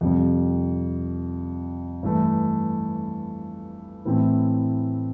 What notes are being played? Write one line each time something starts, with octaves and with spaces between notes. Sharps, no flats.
F2 C3 G3
G2 E3 A3
A2 E3 A3 C4 E4